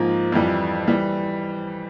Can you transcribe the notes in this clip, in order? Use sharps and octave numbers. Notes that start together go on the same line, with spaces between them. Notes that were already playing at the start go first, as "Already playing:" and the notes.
Already playing: G#2 F3 A#3
F2 E3 G3
E3 G3